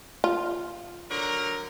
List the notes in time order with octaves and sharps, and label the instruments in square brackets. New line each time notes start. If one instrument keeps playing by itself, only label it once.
[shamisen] F4
[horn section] D3 F#3 A#4